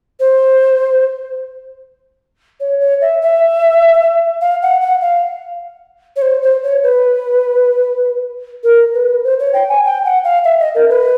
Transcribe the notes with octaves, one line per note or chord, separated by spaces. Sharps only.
C5
C#5
C#5
E5
E5
F5
F#5
F#5
F5
C#5
C5
C5
C#5
B4
A#4
B4
C5
C#5
G5
G#5
G5
F#5
F5
E5
D#5
A#4
B4